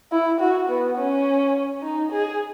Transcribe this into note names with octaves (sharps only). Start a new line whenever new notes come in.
E4
F#4
B3
C#4
D#4
G#4